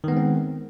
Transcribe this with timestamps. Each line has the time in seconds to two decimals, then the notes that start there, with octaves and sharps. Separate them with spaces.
0.04 D#3
0.08 B3
0.12 G#3
0.17 C4